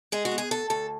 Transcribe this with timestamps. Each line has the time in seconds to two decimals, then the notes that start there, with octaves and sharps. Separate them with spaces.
0.12 G#3 G#4
0.25 F#4
0.32 B3
0.38 G#4
0.51 D2 A4
0.70 D2 A4